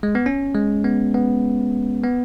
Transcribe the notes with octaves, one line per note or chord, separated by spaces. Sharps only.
G#3
B3
C#4
G#3
B3
B3
B3